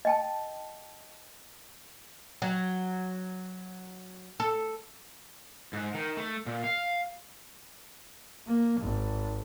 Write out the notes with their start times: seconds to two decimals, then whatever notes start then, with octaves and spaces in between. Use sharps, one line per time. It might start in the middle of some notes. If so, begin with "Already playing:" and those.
0.05 D#5 G5 A5
2.42 F#3
4.40 A4
5.73 G#2
5.94 D#3
6.17 A3
6.46 A#2
6.64 F5
8.47 A#3
8.81 G#1